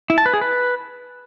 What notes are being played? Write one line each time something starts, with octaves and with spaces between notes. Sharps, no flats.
E4
A5
B4
G#4
B4